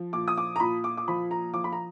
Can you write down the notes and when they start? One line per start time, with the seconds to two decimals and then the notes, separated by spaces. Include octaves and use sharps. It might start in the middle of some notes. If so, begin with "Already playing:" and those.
Already playing: F3
0.13 A#2 D6
0.28 D#6
0.37 D6
0.56 A#5
0.60 A#2 B5
0.84 D6
0.97 D6
1.08 F3 B5
1.31 A#5
1.54 F3 D6
1.64 B5
1.72 A#5